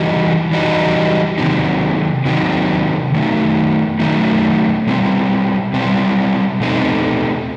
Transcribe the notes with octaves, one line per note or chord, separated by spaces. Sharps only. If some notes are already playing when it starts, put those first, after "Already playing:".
Already playing: E3 G3 D#4 F#4
E3 G3 D#4 F#4
C3 D#3 F#3 C4 D#4
C3 D#3 F#3 C4 D#4
D#3 F#3 A3 D#4
D#3 F#3 A3 D#4
B2 G3 C4
B2 G3 C4
B2 A3 C4 D#4